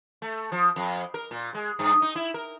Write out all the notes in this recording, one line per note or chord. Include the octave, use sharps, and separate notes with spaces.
A3
F3
F2
A#4
A#2
G#3
G2
D#4
E4
A#4